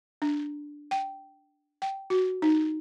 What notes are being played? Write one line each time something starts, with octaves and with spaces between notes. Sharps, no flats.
D4
G5
G5
F#4
D#4